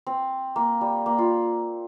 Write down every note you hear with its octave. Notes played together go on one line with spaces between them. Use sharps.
C4
A#3
G3
A#3
F4